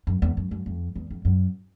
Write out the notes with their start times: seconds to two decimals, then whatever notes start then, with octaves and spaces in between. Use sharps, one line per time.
0.07 F#2
0.22 E2
0.37 F#2
0.51 F#2
0.66 F2
0.95 E2
1.10 F2
1.25 F#2